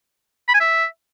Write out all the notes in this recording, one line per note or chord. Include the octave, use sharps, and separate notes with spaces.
B5
G#5
E5